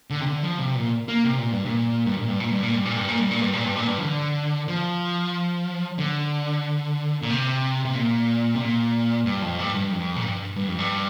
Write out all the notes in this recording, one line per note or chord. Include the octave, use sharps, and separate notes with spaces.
D3
C3
D3
F3
C3
A#2
A#3
C3
A#2
G2
A#2
G2
A#2
G2
A#2
G2
A#2
G2
A#2
G2
A#2
G2
A#2
G2
A#2
G2
A#2
G2
F3
D3
F3
D3
A#2
C3
C3
A#2
C3
A#2
G2
F2
G2
G2
F2
A#2
G2
G2
F2
G2